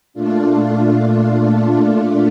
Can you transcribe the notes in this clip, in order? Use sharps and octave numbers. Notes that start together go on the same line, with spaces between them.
A#2 A3 D4 F4